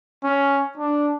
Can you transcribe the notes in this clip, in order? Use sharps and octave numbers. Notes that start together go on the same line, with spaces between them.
C#4
D4